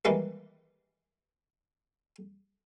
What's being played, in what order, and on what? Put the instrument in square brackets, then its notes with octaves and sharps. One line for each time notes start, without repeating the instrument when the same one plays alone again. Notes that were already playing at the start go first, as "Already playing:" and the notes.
[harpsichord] D#3 E3 G3 G#3 A#3 B4